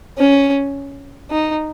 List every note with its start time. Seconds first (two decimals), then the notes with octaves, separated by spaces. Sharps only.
0.18 C#4
1.30 D#4